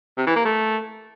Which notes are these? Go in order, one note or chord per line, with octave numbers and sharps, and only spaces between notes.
C3
E3
A#3
A3